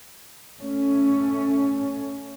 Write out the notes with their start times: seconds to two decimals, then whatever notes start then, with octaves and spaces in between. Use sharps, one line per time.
0.60 A3 C#4